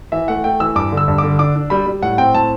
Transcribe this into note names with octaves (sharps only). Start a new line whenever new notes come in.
E3 E5
A3 F#5
A3 G5
E3 E6
G2 D6
D3
E6
G2
D6
D3
D4 D6
D4
G3 B5
G3
A2 F#5
C4 G5
A2 A5